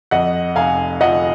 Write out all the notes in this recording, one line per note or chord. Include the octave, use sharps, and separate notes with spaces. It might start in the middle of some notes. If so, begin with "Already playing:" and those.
F2 D#5 F#5
F1 F5 G#5
F3 D#5 F#5